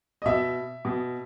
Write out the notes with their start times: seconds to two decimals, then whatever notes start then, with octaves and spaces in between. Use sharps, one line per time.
0.22 D#5
0.26 B2 E5
0.85 B2